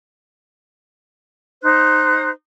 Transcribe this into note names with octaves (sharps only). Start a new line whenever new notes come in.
D#4 C5 F#6